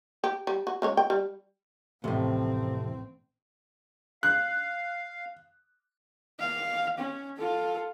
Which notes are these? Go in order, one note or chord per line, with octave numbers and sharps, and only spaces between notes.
G4
G3
F#4
C#3 G#3 C#5
G5
G3
A1 F2 A2 C3 A3 C4
F5 F#6
F5
C#4
F4 A4